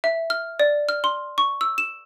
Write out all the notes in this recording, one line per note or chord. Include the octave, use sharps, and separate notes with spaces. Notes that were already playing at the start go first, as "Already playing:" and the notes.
E5
F6
D5
F6
C6
C#6
E6
E7